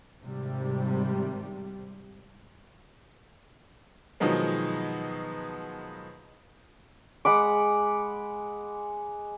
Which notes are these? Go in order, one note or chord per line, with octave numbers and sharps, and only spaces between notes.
G#1 C3 G3
B2 D#3 F3 F#3 G#3 B3
G#3 F#5 B5 D6